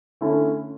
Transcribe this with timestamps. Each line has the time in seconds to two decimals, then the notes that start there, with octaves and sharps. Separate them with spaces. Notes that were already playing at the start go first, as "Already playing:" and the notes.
0.21 D3 A3 C#4 E4 A4